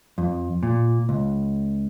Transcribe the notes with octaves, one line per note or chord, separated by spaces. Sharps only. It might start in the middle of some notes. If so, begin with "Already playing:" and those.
F2
A#2
C#2